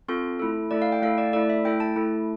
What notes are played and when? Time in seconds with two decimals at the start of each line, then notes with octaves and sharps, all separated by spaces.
0.08 C4 F4 A4 C6
0.39 A3 E4 A4
0.71 A3 E4 A4 D5
0.82 F5
0.92 G5
1.02 A3 E4 A4 F5
1.18 D5
1.33 A3 E4 A4 D5
1.50 E5
1.65 A3 E4 A4 G5
1.80 A5
1.96 A3 E4 A4